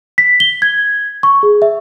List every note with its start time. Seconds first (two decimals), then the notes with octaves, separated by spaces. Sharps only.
0.18 B6
0.40 G7
0.62 G#6
1.23 C#6
1.43 G#4
1.62 E5